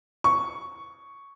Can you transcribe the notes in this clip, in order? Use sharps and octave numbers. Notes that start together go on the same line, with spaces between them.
C#6